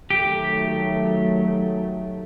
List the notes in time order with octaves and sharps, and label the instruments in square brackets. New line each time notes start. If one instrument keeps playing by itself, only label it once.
[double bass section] D#3 F#3 A3 [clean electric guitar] G4